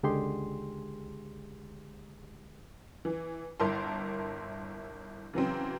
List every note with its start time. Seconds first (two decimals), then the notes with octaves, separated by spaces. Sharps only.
0.03 C#2 D3 G#3 G4 G#4 C6
3.05 E3
3.60 G1 E4 A#4 A5 C6
5.33 C#3 E3 F#3 C4